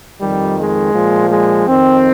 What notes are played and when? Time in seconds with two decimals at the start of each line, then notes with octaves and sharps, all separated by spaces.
0.20 F2 D#3 G3
0.57 G#3
0.93 A#2 F3
1.30 G#3
1.66 F2 D#3 C4